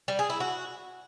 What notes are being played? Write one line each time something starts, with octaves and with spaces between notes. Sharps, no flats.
G3
G#4
E4
F#4